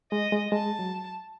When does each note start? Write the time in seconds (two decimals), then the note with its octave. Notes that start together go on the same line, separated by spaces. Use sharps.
0.12 G#3 D#5
0.32 G#3
0.52 G#3 A5
0.79 F#3